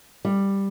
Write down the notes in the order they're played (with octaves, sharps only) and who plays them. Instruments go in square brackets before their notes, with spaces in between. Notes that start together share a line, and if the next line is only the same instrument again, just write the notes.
[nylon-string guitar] G3